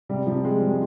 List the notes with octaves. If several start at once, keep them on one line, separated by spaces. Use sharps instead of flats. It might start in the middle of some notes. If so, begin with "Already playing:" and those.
C3 G3
C3 F3
F3 G#3
F3 G3
G#3